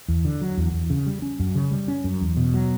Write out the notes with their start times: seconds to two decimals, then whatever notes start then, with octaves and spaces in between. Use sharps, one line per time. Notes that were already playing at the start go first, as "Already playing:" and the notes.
0.08 E2
0.25 D3
0.41 F#3
0.58 E2
0.73 E2
0.90 C#3
1.07 G3
1.22 C#4
1.40 F#2
1.55 C#3
1.71 G3
1.88 C#4
2.04 F#2
2.21 E2
2.37 B2
2.54 F#3